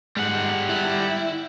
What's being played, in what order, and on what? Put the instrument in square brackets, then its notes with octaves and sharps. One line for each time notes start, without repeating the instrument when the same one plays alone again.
[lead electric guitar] G#2 G#3 [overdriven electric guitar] G3 F#5
[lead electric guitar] E4